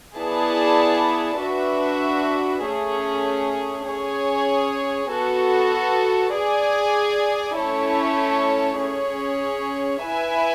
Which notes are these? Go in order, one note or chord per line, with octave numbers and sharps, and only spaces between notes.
B3 E4 G#4 D5 A5
D4 F#4 B4 E5
A3 C#4 G#4
C#4 G#4 C#5 G#5
B3 F#4 A4
G#4 D5 G#5
A3 C#4 E4 A4 C#5
C#4 G#4 C#5
E4 B4 E5 G#5